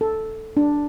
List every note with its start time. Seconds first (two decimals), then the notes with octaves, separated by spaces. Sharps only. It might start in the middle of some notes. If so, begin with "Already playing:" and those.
0.01 A4
0.57 D4